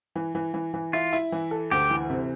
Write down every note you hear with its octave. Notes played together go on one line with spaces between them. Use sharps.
E3
E3
E3
E3
E4 F4
E4
E3
A4
D2 G4
E3
C3